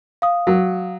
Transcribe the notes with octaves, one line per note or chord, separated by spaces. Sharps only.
F5 D#6
F#3